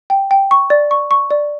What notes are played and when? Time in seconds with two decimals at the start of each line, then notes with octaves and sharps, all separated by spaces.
0.10 G5
0.31 G5
0.51 C#6
0.70 D5
0.91 C#6
1.11 C#6
1.31 D5